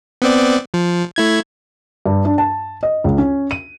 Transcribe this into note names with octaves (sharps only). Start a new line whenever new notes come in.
B3 C4 D5
F3
A3 E4 G#6
G2
D4
A5
D#5
C#2
C#4
D#7